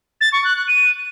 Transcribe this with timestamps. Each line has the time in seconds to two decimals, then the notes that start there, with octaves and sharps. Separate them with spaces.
0.21 A6
0.33 C#6
0.44 F#6
0.56 F#6
0.68 D#7